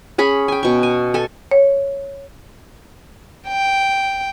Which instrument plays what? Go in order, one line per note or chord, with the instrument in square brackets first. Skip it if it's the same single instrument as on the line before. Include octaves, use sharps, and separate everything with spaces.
[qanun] C#4 G#4 B5
G5 G#5
B2 C#6
G#5
A4 G#5
[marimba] C#5
[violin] G5